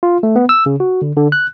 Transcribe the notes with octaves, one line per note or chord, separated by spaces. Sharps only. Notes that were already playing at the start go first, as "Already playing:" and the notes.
F4
A3
B3
E6
C#3
F#4
D3
D3
F#6